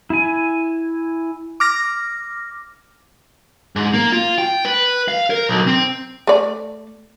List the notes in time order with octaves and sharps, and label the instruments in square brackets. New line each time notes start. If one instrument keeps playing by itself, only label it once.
[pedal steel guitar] E4 G#5
[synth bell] D6 F6 A#6
[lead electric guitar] G#2
A#3
F4
G5
B4
F5
A#4
B1
C4
[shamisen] A3 D5